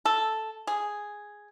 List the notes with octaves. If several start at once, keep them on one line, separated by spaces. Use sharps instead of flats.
A4
G#4